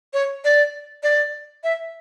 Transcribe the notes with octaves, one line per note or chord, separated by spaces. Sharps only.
C#5
D5
D5
E5